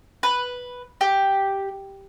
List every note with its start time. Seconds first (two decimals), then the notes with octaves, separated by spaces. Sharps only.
0.23 B4
1.01 G4